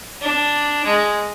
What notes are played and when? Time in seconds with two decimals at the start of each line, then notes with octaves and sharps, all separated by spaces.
0.21 D4
0.85 G#3